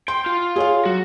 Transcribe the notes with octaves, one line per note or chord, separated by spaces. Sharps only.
G5 C6
F4
G#4 C#5 F5
F#3 F#4